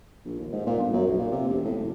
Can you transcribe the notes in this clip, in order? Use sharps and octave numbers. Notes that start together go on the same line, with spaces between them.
A#1
D#2
G#2
A#2
G1
F#2
B1
A#2
C3
E1
A2
F#1